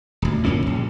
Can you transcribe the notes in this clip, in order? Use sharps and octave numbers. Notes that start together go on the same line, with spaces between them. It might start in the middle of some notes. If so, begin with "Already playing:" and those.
D#1 D2
F#2 A#2 A#3 C#4
A#1